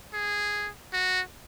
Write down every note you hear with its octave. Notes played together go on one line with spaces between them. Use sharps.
G#4
F#4